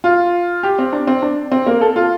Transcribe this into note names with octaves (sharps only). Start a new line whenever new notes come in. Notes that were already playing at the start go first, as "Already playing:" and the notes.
F4
G4
C4
D4
C4
D4
C4
A#3
A4
F4